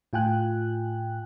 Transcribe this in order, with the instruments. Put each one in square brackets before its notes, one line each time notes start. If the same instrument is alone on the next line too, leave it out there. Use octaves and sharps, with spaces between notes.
[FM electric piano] A2 F4 G5 G#5 F#6